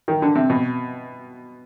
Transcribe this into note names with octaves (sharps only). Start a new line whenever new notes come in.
D#3
D3
C3
B2